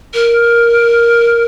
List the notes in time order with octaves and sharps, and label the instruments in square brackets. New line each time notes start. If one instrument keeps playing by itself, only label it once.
[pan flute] A#4